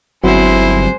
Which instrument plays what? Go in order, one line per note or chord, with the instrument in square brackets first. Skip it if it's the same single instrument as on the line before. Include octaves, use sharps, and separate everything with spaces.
[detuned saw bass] G1 [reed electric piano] F#3 C4 F#4 [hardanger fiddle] G#3 C5 [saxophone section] E4